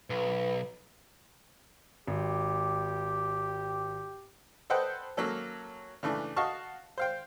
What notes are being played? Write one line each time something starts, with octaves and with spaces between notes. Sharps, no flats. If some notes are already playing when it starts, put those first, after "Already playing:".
B1 B4
G#1 G4
A4 B4 C5 D#5 F#5 G5
F#3 A#3 C#4 A4
C#3 E3 A3 D4
F#4 D#5 F5 A5 C#6
C5 F5 G5